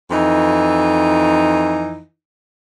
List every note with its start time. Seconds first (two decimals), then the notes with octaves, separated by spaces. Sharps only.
0.11 F2 E3 D#4